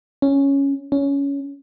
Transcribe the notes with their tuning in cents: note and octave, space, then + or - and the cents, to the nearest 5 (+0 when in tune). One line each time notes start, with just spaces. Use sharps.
C#4 +0
C#4 +15